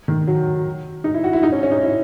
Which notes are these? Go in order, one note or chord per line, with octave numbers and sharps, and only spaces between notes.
D#3
F#3
D#4
E4
F#4
E4
D#4
C#4
C#4
D#4
E4